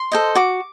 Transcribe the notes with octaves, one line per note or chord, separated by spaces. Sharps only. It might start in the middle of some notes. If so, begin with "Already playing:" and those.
Already playing: C6
A4 C5 D#5
F#4 D6